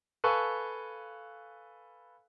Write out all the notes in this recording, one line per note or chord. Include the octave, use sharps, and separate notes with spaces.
A4 B4 F5 G#5 C#6 E6